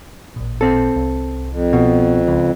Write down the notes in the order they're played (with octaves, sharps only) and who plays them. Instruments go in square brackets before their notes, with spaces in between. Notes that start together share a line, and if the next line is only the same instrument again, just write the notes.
[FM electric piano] A1 A#2
[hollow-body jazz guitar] C4 A4
[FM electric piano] C2
[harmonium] F2
[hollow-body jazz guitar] B2
C#2